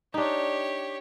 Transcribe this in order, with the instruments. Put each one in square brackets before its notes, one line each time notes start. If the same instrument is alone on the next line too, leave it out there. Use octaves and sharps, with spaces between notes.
[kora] D4 D#4 [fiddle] G4 C#5